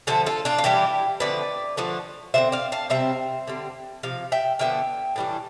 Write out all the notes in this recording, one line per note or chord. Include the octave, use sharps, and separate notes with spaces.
D3 F3 A3 A4 C5
F4 A4
D4 F4
F4
E3 G3 D4 E4 G4
D3 F3 A3 C4 B4 D5
D3 F3 A3 D4
D3 G3 C4 C5 E5
D5 F5
F5 A5
C3 G3 C4 C5 E5
D3 G3 C4
C3 F3 F5
E5 G5
D3 F3 B3 D4 E5 G5
A2 E3 G3 D4